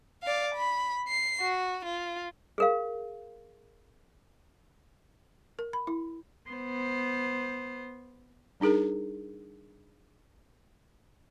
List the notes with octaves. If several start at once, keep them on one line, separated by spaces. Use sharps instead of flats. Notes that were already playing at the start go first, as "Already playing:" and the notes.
D5 F5
B5
C7
F#4
F4
G#4 A#4 F5
A#4
B5
E4
B3 C5
G3 D4 D#4 G#4 A#4